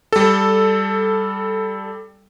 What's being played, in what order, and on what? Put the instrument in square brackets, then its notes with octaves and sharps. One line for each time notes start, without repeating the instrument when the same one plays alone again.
[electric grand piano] G3 A4